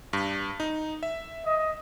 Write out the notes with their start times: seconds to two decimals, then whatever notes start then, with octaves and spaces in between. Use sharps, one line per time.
0.13 G2
0.60 D#4
1.03 E5
1.45 D#5